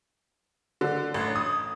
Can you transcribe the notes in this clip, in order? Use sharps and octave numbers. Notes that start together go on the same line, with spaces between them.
D3
A1
D#6